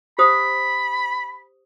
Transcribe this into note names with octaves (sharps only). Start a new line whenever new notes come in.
G4 C5 B5 D#6